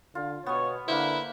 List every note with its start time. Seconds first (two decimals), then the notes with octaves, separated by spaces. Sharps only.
0.15 D3 F4
0.46 B2 B3 C#5 G#5
0.88 D3 A#3 E4 B4 C5